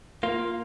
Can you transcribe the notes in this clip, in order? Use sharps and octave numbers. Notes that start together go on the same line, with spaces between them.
A#3 F4